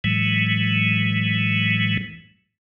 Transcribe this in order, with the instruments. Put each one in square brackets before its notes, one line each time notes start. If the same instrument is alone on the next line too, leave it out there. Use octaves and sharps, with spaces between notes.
[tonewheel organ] A2 E3 F#3 G#3